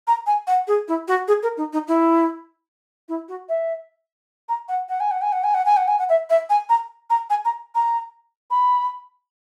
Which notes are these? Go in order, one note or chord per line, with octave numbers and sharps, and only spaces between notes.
A#5
G#5
F#5
G#4
E4
F#4
G#4
A#4
D#4
D#4
E4
E4
F#4
E5
A#5
F#5
F#5
G#5
F#5
G#5
F#5
G#5
F#5
G#5
F#5
G#5
F#5
E5
E5
G#5
A#5
A#5
G#5
A#5
A#5
B5